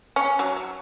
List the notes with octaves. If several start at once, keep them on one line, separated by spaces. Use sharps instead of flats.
C#4
F#3
F#3